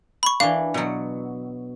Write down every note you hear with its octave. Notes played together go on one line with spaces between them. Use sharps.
B5 C#6
E3 D4 F5
B2 F#3